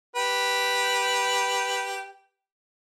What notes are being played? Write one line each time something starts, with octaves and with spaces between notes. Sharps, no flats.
G4 B4